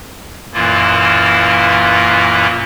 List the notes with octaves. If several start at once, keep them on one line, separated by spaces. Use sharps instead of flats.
F#2 A#2 E3 A#3 E4 F4